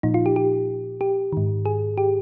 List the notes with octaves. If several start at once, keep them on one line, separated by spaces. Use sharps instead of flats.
A#2 F3 D#4
F4
G4
G4
G4
G#2 D#3
G#4
G4